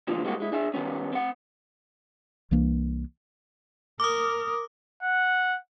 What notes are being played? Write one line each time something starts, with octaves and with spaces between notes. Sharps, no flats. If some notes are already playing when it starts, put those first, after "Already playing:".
D2 A#2 D3 E3 F3 G3
G3 G#3 A#3 C4 F#4
G#3 E4
D4 G#4 E5
D#3 G3 B3 C#4
C4 F#5
C2 E3 A#3 D4
A#4 D6 D#6
F#5